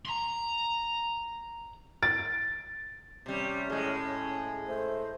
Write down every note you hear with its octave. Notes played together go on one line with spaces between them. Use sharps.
A#5 C6
A6 D7
C3 G3 C#4
A2 G#3 G#4
A3 C5